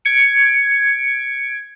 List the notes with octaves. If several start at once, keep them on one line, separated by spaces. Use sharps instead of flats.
G#6 C#7 D7